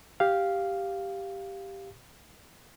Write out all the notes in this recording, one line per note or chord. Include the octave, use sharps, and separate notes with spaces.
G4 F5